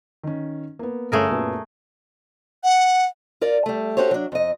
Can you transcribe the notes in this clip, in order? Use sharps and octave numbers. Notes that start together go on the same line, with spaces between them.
D#3 C#4
A#3 B3
G1 A3 C#4 G#4 A#4 C#5
F#2 A#2 B3
F#5
F4 A#4 D5
G3 A3
C#4 F#4 G4 A4 C5 C#5
F#3 D4
F2 D#5